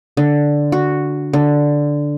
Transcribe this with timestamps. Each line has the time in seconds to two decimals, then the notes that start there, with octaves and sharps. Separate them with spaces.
0.17 D3
0.72 F#4
1.33 D3